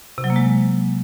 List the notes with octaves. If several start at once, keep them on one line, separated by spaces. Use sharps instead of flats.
C3
F#3
A#3
G#3